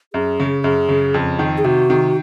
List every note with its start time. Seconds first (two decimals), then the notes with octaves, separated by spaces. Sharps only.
0.13 F#2 G#4
0.40 C#3
0.64 F#2 G#4
0.89 C#3
1.14 F2
1.39 D#3
1.58 G#4
1.64 C3 F#4
1.90 D#3